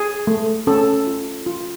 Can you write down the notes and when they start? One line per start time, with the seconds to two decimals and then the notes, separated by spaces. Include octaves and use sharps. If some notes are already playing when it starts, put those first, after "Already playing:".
Already playing: G#4
0.27 A3
0.67 C#4 A4
1.07 F4
1.46 F4